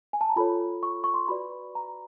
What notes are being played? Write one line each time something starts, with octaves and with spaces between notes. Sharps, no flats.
G#5
A5
A#5
F4 A4 C#5 B5
C#6
C#6
C6
F#4 B4 D5 B5
A#5